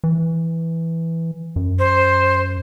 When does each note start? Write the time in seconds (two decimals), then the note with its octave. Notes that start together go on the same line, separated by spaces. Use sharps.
0.04 E3
1.56 F#2
1.79 C5